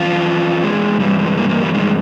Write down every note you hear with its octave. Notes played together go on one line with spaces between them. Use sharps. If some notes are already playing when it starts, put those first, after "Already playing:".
Already playing: F2 E3 F4
G#3
G2 E3 G3
G#3
A#3
A#3
G3
G#3